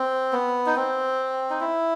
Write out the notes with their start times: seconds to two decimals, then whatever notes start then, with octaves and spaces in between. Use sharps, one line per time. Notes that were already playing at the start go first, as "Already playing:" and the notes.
Already playing: C4
0.33 B3
0.66 D#4
0.76 C4
1.50 D#4
1.60 E4